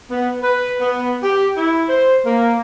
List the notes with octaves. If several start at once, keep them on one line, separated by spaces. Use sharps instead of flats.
B3
B4
B3
G4
E4
C5
A#3